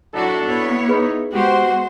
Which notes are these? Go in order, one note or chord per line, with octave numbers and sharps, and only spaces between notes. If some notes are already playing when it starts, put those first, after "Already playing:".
F#3 D4 E4 F#4 A4
B3 E4 C#5
D#4 G#4 B4 B5
G#3 B3 F#4 G4 C5